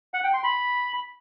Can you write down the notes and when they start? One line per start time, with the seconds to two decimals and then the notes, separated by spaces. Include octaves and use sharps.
0.14 F#5
0.24 G5
0.34 C6
0.44 B5